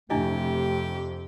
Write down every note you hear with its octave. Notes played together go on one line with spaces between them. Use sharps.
F2 C3 A3 D4 E4 G4 D#5